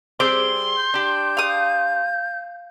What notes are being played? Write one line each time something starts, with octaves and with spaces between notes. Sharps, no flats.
G3 C4 G#4 C5 C6 D6
G6
D4 G4
F5 D#6